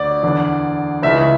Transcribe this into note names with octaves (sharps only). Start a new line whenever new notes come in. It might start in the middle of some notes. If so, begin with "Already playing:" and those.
Already playing: D2 D5
E2 D3
C#2 C#3 E3 E5